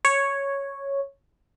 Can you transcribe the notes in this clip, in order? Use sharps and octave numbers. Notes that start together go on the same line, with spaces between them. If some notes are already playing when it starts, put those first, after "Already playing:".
C#5